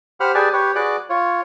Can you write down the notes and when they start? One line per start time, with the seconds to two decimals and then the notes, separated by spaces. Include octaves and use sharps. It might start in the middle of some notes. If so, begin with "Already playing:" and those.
0.20 G4 C5 F#5 B5 F6
0.35 G4 G#4 B4 D5 G#5 A5
0.53 G4 B4 C#5
0.75 F#4 G#4 B4 D5 D6 F#6
1.09 F4 C#5